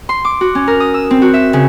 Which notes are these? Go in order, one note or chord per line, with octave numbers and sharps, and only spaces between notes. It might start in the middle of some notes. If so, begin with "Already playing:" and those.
C6
D6
F#4
C#4
A#4
D#6
E6
C4
F#4
E5
C#3